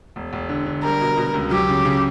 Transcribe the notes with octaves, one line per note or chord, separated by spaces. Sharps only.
E1
E1
D3
D3
G3 A#4
B2
B2
C#2
F#3 G4
C#3
C#3